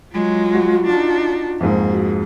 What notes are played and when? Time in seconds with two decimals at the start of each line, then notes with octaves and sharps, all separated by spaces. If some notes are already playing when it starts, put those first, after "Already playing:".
0.13 F#3 G#3 F4
0.55 F#4
0.87 D4 D#4
1.61 F2 G#2 A#3
1.90 F#4